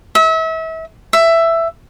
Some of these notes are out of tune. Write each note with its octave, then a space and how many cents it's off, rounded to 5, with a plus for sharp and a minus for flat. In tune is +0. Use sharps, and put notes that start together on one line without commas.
E5 -35
E5 +10